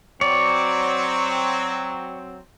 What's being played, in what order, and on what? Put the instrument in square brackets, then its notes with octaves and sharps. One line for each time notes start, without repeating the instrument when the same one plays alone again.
[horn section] F#3 C4 [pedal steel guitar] C#5 D5